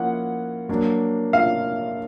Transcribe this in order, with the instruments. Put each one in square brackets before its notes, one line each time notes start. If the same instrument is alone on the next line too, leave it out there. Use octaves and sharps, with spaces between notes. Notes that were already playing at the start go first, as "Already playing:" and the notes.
Already playing: [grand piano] F3 A#3 C#4 E4 [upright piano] F#5
[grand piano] F#3 A#3 D4
[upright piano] F5